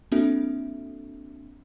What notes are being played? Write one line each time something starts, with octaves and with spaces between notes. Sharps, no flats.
A#3 C4 D4 F#4 A4 E5